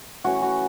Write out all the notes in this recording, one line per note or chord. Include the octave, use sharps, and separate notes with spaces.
E3 A3 C#4 F#4
F#4